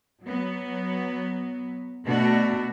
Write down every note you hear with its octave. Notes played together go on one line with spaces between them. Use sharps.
F#3 B3
B2 A3 D4 F#4